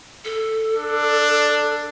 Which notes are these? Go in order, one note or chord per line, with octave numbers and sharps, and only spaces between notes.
A4
D4